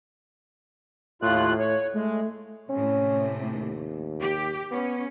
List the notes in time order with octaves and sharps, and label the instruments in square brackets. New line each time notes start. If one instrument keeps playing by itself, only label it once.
[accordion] D#2 F4 F#6 [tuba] A2
[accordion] C#5
[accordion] G#3 [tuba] A3
[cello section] A2 C3 [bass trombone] C#4
[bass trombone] D#2
[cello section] G4
[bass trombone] B3 [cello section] C#4